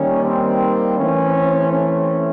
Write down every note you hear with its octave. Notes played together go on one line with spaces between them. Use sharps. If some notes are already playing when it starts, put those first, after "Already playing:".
Already playing: D#3 G3 A#3 C#4
C4
E3 A3 C4 C#4
C#4